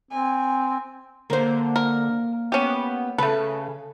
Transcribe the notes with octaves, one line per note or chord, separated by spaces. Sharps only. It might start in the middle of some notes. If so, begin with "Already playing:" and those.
C4 G#5
D3 A#3 C5
A#4
B3 C#4 G4
C#3 A3 A4 B4